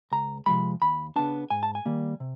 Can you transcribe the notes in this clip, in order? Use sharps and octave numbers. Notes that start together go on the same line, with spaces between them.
C#2 A#5
C3 F3 G#3 B5
D#2 B5
C#3 F#3 B3 D4 A5
G#2 G#5
A5
G#5
D#3 G3 A#3
C3